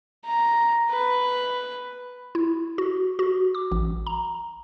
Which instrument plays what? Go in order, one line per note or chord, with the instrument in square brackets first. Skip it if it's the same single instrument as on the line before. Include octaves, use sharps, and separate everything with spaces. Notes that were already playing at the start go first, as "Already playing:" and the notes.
[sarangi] A#5
B4
[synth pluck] E4
F#4
F#4
D6
A1
A#5